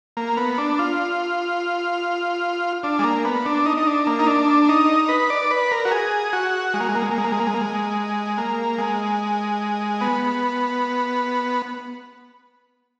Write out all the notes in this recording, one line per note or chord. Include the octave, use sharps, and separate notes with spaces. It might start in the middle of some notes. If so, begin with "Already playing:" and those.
A#3
B3
D4
F4
D4
G#3
A#3
B3
D4
D#4
D#4
D4
A#3
D#4
D4
D#4
B4
D5
B4
A#4
F#4
G#4
F#4
G#3
A#3
G#3
A#3
G#3
A#3
G#3
A#3
G#3
A#3
G#3
A#3
G#3
A#3
G#3
B3